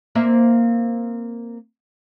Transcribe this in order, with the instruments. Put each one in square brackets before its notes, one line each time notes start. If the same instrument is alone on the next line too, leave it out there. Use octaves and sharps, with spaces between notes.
[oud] A#3 C4 E5